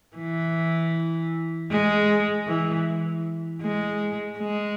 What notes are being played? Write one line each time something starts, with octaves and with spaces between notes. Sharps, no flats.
E3
G#3
E3
G#3
G#3